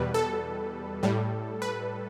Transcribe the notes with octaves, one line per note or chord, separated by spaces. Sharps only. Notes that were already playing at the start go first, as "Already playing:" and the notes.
Already playing: E2 B2 G3 B4
A4
A2 G3
B4